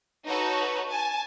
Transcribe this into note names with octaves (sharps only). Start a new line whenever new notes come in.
D#4 F#4 A4 B4 C#5
G#5 A5